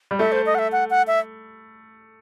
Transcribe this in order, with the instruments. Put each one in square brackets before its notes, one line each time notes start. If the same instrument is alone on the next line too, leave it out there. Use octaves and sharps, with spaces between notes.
[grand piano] G3
[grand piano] A3 [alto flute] E5
[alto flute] C5
D#5
F#5
E5
F#5
F#5
E5